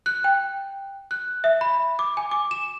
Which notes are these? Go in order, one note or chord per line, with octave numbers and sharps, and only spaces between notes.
F#6
G5
F#6
E5
B5
D6
G#5
D6
E7